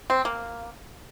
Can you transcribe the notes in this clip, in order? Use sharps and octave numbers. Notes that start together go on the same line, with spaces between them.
C4
A#3